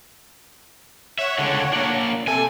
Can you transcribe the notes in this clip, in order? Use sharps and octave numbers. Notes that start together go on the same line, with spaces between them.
C#5 E5 F#5
C#2 D3
A#3 D4
C3 A4 G#5